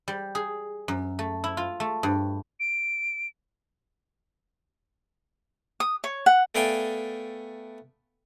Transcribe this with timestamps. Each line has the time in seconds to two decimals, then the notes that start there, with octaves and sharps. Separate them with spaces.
0.08 G3
0.35 G#4
0.88 F#2
1.19 A3
1.44 E4
1.57 F4
1.80 A3
2.03 G2
2.60 D7
5.80 D#6
6.04 C#5
6.26 F#5
6.55 A3 B3 D5 F5 G5 G#5